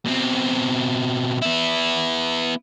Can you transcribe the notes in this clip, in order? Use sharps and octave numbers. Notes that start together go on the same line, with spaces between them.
B2 C4
B3 E4